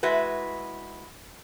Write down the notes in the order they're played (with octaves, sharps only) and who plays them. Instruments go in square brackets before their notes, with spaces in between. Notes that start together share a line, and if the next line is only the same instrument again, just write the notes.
[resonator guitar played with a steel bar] G#3 E4 F#4 B4